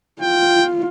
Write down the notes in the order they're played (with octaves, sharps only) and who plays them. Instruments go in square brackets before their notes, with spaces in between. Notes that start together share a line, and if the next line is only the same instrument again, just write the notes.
[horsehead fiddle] F4 [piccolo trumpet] G5